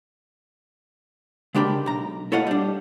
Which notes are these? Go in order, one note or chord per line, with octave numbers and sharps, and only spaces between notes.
C#3 G#3 D4 G4 A#4 B5
B1 A#5
E4 A4 C#5 D#5 F5 F#5
G3 D4